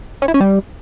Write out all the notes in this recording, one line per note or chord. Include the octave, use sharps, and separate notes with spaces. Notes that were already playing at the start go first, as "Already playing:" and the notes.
C#4
E4
C#4
G3